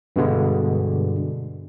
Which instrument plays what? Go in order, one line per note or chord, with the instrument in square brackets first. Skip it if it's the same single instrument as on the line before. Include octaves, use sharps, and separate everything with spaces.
[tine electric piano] G2 B2 D3 G#3